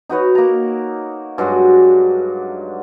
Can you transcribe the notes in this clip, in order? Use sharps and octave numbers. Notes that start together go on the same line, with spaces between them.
D#4 F#4 B4 C#5
A#3 A#5
G2 F#3 G#3 F#4